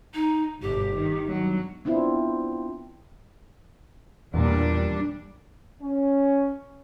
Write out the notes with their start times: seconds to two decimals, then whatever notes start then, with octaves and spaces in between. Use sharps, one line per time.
0.14 D#4
0.62 G1 B2 G4
0.93 D#3
1.28 G2 B2 F#3
1.85 B3 C4 D4 E4 F4
4.34 E2 A#2 G3 D4
5.82 C#4